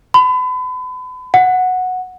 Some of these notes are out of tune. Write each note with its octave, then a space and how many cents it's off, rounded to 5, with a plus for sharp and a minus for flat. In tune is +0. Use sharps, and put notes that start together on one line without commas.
B5 +35
F#5 -10